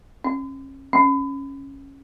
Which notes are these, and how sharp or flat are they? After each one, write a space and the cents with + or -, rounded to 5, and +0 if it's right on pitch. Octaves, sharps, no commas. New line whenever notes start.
C#4 -35
C#4 -10